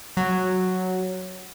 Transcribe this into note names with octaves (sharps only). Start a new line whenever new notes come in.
F#3